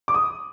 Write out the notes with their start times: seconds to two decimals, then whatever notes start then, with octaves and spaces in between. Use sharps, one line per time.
0.08 D6
0.14 D#6